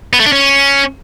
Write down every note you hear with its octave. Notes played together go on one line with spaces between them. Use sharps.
B3
A3
D4
C#4